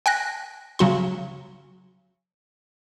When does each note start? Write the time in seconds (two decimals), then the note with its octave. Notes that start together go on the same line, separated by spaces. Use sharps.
0.06 G5 G#5 F#6 A#6
0.79 C#3 F#3 F#4 C6